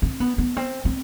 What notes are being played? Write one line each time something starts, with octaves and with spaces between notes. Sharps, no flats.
C4
B3
B3
C4
C4